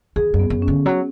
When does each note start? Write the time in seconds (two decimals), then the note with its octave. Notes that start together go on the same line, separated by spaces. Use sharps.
0.16 E2 G#4
0.34 F#2
0.39 B3
0.50 F#2
0.62 C#4
0.68 D3
0.86 F#3